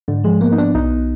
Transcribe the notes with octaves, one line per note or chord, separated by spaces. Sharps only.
G#2 D3
F3 G#3
A#3 B3
D#4
B3 D4
B1 D#4
B1